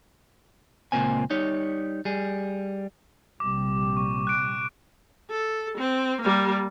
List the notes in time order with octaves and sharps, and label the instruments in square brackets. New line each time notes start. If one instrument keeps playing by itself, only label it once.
[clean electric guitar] C#2 A#2 A#3 C4 G#5
G3 D#4 C#5
G3 G#4
[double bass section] A#1 C3 G3 [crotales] D6
[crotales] C#6
F#6 D7
[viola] A4
C4
G3 A#3